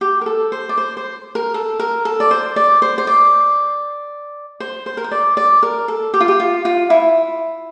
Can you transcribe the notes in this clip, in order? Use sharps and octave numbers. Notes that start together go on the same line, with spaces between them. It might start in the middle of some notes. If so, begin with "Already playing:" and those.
G4
A#4
A4
C5
D5
C5
C5
A#4
A4
A#4
A4
D5
C5
D5
C5
C5
D5
C5
C5
A#4
C5
D5
D5
A#4
A4
G4
F4
G4
F4
F4
E4